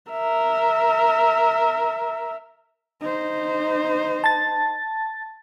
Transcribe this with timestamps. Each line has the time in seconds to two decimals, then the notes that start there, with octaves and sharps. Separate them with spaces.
0.11 A#4 E5
3.01 D#4 C5
4.24 A5 A6